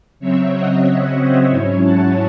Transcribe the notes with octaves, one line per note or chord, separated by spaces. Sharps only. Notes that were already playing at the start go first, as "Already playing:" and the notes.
C#3 F#3 C4 C#5 E5
D#5 F#5
D#5 F#5
C5
G#2 F#3 C#4 E4 C#5
F#5 A5